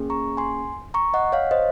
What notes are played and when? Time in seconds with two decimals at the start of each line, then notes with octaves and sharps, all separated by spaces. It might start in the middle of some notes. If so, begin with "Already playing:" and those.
Already playing: A#3 C#4 G#4
0.10 A#5 C#6
0.37 G#5 C6
0.94 A#5 C#6
1.14 D#5 F#5
1.32 C#5 F5
1.51 C5 D#5